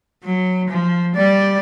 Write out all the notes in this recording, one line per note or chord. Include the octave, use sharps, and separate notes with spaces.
F#3
F3
G3 D5